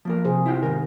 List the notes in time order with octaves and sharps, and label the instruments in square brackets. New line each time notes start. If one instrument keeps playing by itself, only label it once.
[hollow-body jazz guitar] F3 A#3 A#4
[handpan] C3 G#4 C5
[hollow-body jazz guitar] E4 F4 G5
[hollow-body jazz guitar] G#2 E3 A#4 [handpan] D#3